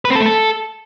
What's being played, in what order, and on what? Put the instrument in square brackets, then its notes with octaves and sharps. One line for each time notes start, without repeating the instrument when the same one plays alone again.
[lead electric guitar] B4
C4
A4
A3
A4